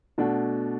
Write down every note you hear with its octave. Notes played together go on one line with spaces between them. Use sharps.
B2 A3 D4 F#4